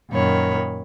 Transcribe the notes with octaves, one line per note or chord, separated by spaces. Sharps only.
F#2 A#2 D#3 C#5 B5